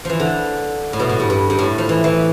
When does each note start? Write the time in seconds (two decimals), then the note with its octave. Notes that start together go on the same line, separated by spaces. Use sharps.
0.05 E3 F3
0.20 D3
0.93 A2
1.00 B2
1.09 A2
1.20 G2
1.30 G2
1.50 G2
1.59 A2
1.78 F3
1.89 E3
2.04 E3